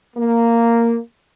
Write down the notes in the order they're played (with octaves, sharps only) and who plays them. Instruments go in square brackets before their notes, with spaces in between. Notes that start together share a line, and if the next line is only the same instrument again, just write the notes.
[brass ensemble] A#3